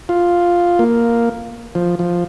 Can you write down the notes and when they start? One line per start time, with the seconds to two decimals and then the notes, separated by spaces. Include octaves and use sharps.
0.09 F4
0.79 A#3
1.75 F3
1.99 F3